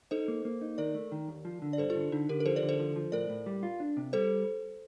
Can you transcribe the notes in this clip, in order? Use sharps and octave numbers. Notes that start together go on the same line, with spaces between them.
D#4 A4 C5
A#3
A#3
D#4
D#3 A#4 D5
A3
D#3
D#2
F3
D3
D5
G2 A4 C5
F4 A4
D3
D3 D#4
D3 G4 A#4
A#4
F3 A4 C5
A#4 D5
D3
A4 C5
F3
F3
A2 A#4 D5
A2
G3
F4
D4
C3
G3 A4 C5